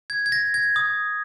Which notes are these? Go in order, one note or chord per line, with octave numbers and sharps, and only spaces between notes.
G#6
G#6
A#6
G#6
D#6